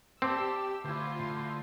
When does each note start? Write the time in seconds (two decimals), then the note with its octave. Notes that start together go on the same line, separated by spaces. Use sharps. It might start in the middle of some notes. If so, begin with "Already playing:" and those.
0.22 C4 G4 D5 E5 A5 E6
0.85 D2 E4 F4 C5 C6